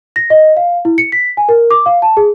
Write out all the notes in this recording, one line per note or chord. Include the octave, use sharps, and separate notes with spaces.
A#6
D#5
F5
E4
C#7
B6
G#5
A#4
D6
F5
A5
G#4